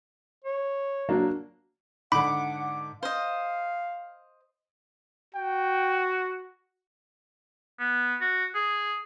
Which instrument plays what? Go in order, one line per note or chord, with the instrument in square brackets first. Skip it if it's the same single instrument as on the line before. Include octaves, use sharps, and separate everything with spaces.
[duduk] C#5
[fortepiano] F#3 A#3 D4
[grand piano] G#2 D3 [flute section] F#5 [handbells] B5 [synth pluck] D6
[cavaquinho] C5 D#5 [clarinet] F5
[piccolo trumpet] F#4 [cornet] G5
[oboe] B3
F#4
G#4